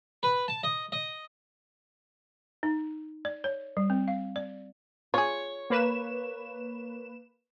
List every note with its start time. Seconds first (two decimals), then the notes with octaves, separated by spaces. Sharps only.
0.23 B4
0.48 A5
0.63 D#5
0.92 D#5
2.63 D#4
3.25 D5
3.44 C#5
3.77 G3
3.90 C4
4.08 F5
4.36 D5
5.14 F4 G#4 C#5
5.70 A#3 B4 E7